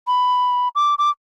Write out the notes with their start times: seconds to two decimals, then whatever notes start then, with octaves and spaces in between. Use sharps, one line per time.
0.07 B5
0.75 D6
0.98 D6